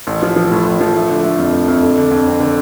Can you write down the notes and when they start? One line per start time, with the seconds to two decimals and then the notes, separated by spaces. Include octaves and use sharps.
0.07 A1
0.23 F3
0.36 F3
0.52 A2
0.66 A1
0.81 F3
0.95 A3
1.09 D3
1.23 A3
1.38 F2
1.53 A3
1.68 F2
1.83 D3
1.98 D3
2.11 F2
2.27 C4
2.40 D3